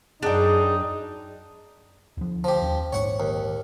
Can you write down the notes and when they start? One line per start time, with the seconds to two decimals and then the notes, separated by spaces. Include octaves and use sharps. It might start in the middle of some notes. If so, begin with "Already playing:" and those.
0.23 F#2 D4 D#4 G#4 G5
2.17 D2 F3
2.44 D2 F3 G4
2.62 D#2 C#4
2.93 A#1 G#2 C#5 F#5 C#6
3.20 D#2